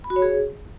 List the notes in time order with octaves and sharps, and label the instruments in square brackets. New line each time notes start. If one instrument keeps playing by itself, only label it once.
[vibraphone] B5
F#4
C#5
G#4